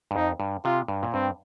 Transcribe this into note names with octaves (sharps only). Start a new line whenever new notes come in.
G2
F2 D#4
G2
C3 F4
G2
A#2
G2 C4